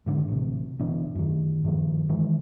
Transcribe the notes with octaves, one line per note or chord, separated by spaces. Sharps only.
G#2 D3 D#3
A1 C3
G1 B2 E3 D4
F#2 D#3
G2 D#3 F3
D#3 E3 G#3